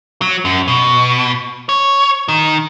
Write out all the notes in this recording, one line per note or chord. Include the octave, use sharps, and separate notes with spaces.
F#3
F#2
B2
C#5
D#3